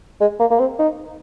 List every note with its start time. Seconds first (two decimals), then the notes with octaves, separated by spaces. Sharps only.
0.21 G#3
0.40 A#3
0.51 A#3
0.60 C4
0.79 D#4